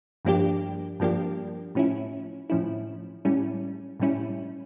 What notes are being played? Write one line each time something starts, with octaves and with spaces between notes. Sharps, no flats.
G2 F3 A#3 D4 G4
G2 F3 A#3 D4 G4
A2 F3 C#4 E4
A2 F3 C#4 E4
A2 G3 C#4 E4
A2 G3 C#4 E4